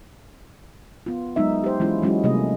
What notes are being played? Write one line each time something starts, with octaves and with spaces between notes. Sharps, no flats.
B3 F4
F#3 G#3 B3 D#4 E5
G4 C5
E3 G#3 C#4 E4 F4
F#3 G#3 C#4 E4 F#4
C3 G3 A3 A#3 G#4 D#5